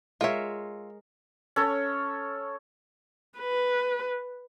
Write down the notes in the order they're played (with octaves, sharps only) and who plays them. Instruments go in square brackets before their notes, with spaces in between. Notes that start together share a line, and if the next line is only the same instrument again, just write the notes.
[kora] G#3 A#4 C#5 [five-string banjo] F4 E5
[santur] C#4 A4 C#5
[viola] B4